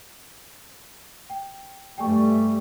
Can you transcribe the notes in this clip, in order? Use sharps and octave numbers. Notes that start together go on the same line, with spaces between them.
G5
G2 G3 A3 G5 G#5 C#6